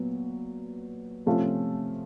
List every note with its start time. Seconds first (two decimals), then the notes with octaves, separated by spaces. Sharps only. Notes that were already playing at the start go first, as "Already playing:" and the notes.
Already playing: A#2 F#3 B3
1.26 C3 F3 A3 C#4 F4